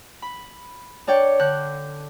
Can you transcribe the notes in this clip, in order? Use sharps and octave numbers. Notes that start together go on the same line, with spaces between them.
B5
D4 C#5 D5 G5
D3 F#6 G6